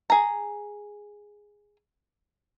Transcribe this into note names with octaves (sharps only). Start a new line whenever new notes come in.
G#4 A#5